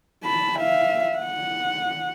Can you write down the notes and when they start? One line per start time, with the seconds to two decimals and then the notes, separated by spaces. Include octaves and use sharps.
0.24 A5 B5
0.59 E5 F5
1.18 F#5